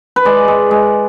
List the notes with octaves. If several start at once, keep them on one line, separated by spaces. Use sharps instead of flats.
B4
G#3 D5
G#3
G#3